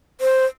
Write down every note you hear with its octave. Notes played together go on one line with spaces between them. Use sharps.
C5